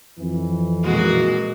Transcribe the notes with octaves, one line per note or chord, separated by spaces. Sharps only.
F2 E3
A#2 G#3 F#4